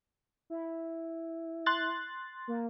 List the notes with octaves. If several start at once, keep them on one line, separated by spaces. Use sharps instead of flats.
E4
C6 F#6 A6
A#3